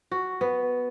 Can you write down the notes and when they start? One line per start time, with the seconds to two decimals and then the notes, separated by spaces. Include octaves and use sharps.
0.11 F#4
0.41 B3